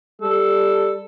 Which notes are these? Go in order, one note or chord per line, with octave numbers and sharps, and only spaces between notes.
G3 A4